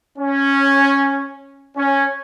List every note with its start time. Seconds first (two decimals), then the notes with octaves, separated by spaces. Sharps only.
0.18 C#4
1.77 C#4